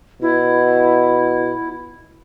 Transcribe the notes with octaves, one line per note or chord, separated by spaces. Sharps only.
B2 E4